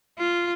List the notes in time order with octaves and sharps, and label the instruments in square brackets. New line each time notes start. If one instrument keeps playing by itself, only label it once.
[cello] F4